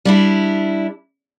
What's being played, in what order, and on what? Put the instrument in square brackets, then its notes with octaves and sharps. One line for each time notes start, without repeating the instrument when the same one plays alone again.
[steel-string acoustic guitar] G3 D4 E4